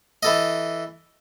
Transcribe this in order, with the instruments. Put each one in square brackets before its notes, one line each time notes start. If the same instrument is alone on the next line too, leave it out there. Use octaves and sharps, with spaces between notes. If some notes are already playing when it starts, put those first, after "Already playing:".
[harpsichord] E3 A4 D#5